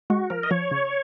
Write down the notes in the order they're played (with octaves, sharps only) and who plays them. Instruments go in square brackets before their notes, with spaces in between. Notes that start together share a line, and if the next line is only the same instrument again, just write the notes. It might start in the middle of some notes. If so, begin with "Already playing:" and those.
[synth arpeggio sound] G#3 [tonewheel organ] F#4
[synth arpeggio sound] F3 [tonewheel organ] A#4
[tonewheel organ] D#5
[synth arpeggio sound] F3 [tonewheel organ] C#5
[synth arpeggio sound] C#3